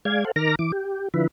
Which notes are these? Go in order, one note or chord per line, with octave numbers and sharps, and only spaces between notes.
G#3 D5 F5 G#6
A4 C5 F5 F#5
D#3 A#4 A#5 D6 F6 A#6
E3 D6
G4
D3 F3 E4 B4